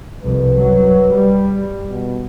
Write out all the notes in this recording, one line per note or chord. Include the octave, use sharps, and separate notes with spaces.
C2 F2 B4
F#2 F#3
G3
B2